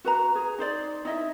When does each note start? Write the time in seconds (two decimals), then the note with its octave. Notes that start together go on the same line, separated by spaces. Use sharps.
0.04 F#4 B4 A#5
0.35 G#4
0.58 D#4 C5 D5
1.05 D#4 E4 D#5 E5